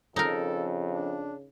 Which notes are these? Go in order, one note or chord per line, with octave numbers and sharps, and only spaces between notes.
F2 C#3 D#4 A4 A#4
D4